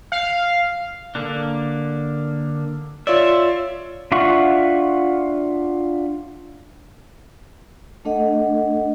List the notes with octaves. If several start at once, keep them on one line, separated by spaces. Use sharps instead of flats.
F5
D3 A#3 D4
F4 C#5 D5 E5
D4 F4 E5 F#5 C#6
A3 D4 A4 D#5 F#5